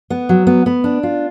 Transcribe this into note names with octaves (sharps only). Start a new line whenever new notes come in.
B3
F#3
B3
B3
D4
F4